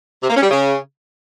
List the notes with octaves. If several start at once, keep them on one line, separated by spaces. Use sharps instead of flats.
C3
A#3
C#4
G3
C#3